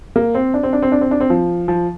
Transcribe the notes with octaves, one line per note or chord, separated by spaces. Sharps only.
A#3
C4
D4
C4
D4
C4
D4
C4
D4
C4
F3
F3